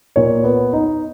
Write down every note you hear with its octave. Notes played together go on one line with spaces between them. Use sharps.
A#2 C#5
B3
D#4